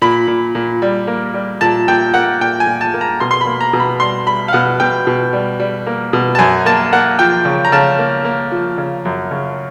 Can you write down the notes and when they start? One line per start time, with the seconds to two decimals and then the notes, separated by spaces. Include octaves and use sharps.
0.02 A#2 B5
0.28 A#2
0.55 A#2
0.82 G3
1.07 A#3
1.34 G3
1.61 A#2 A5
1.88 A#2 G5
2.14 A#3 F#5
2.41 A#2 G5
2.60 G#5
2.67 A#2
2.81 A5
2.94 A#3
3.01 A#5
3.20 B2 C6
3.31 C6
3.41 B5
3.47 A#3
3.61 A#5
3.73 B2
3.80 B5
4.00 G3 C6
4.26 G3 B5
4.48 F5
4.53 B2 F#5
4.80 B2 G5
5.07 B2
5.33 G3
5.60 G3
5.86 A#3
6.13 B2
6.35 A5
6.39 F#2 G#5
6.66 A#3 A5
6.92 A#3 F#5
7.19 F3 G5
7.45 C#3
7.65 A#5
7.72 C#3 A5
7.99 A#3
8.25 A#3
8.52 F3
8.78 C#3
9.05 F#2
9.31 C#3